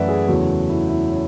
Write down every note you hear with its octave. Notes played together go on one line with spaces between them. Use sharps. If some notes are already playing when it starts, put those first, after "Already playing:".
Already playing: F#2 E3 A3 B4 D5 E5 F#5
G#4
E2 C#3 F#3 A3 F#4
E4
E4
C#4